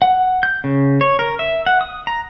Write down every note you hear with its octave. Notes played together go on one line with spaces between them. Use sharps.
F#5
G6
C#3
C#5
A#4
E5
F#5
D#6
A#5